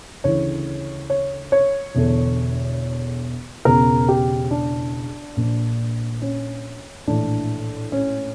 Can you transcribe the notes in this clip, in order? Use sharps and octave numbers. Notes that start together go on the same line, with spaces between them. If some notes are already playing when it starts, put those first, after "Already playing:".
D2 C#3 E3 C#5
C#5
C#5
E1 E2 D3
E1 E2 C#3 A#4
G4
D4
A#1 A#2
C#4
A#1 A2 E3 D4
C#4